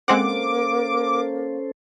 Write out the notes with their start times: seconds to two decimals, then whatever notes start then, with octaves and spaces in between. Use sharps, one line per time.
0.08 G#3 A#3 C4 C#4 A4 C5 F#5 D6